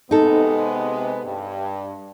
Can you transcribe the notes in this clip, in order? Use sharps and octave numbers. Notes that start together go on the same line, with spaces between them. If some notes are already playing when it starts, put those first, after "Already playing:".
C3 G#3 B3 D#4 A4
G2